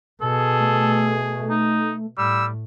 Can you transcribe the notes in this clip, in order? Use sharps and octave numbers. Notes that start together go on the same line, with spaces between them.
B2 G#4 A4
A3
D#4
A2 G3 E6